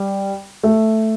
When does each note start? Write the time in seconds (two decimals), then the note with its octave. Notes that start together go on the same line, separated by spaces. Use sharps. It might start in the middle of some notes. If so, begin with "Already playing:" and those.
Already playing: G3
0.63 A3